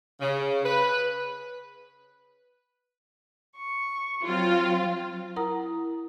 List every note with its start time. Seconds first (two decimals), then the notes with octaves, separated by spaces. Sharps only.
0.21 C#3
0.65 B4
3.56 C#6
4.24 F#3 C4 F4
5.36 E4 A#4 F#5 A#5 D#6